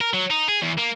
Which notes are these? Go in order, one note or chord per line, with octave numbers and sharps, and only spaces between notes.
A#4
F#3
D#4
G#4
E2
A#3